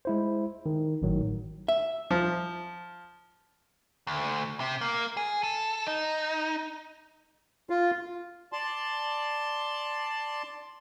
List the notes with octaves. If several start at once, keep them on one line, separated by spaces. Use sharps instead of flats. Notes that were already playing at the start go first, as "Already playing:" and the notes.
G#3 E4 C5
D#3
G#1 A2 D#3 F#3
E5
F3
D2
C3
A#3
G#4
A4
D#4
F4
D5 A5 C6